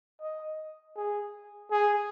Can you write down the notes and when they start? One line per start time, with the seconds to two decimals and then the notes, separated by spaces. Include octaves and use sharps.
0.22 D#5
0.96 G#4
1.71 G#4